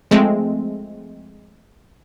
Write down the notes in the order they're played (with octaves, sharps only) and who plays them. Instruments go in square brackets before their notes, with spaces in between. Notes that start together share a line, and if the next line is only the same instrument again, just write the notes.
[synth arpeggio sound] F3 G#3 A3 C4